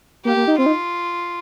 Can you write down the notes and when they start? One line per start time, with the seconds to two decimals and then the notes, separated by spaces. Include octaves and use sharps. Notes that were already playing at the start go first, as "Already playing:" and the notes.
0.25 A#3 G4
0.36 A#3
0.47 D#4
0.58 C4 F4
0.66 D#4